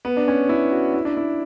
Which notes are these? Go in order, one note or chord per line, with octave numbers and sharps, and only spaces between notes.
B3
D4
C#4
E4
F#4
E4
D4
E4